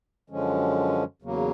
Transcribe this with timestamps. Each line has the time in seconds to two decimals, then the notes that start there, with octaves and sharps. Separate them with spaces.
0.30 F#2 D3 F3 G#3 C#4
1.22 E2 C#3 F#3 A#3